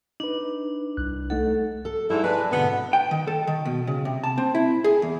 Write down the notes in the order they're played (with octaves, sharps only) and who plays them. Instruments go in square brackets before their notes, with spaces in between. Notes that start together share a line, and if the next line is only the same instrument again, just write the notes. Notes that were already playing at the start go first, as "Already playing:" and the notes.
[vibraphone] D4 [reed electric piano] D#4 B4
[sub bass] C2 [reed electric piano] F#6
[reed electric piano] A3 D#4 F#5 [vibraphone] A4
[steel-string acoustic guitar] A4
[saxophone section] G#2 A3 E4 [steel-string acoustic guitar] G3 A4
[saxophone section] G#3 B4 [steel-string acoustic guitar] D5 A5
[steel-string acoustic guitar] G#2 B2 D3 [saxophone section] B3
[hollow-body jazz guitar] G5
D#3
A4
D#3
B2
C#3
C3
A5
C4
E4
G#4
E2